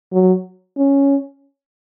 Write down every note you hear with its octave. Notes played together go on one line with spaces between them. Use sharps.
F#3
C#4